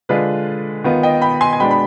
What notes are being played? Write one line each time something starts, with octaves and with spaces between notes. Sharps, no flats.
D3 G#3 D4 F4 B4
D#3 B3 F4
D#5 G5
G5 B5
G#5 C6
G#5
B2 G#3 B3 D4 G5 B5
B5